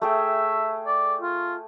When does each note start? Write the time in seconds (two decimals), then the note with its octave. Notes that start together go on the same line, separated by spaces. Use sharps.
0.02 A3 G#4 E5 G5
0.86 D5
1.21 F4